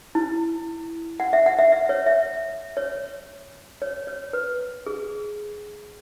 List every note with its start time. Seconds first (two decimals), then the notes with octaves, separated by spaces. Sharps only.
0.15 E4
1.20 F#5
1.33 E5
1.46 F#5
1.59 E5
1.72 E5
1.89 C#5
2.06 E5
2.77 C#5
3.82 C#5
4.07 C#5
4.33 B4
4.86 G#4